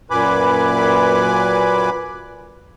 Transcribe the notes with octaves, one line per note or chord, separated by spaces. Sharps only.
F#2 A#2 B4 G#5 B5 D6